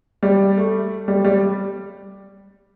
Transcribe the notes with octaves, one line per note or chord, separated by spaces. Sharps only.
G3
A3
G3
G3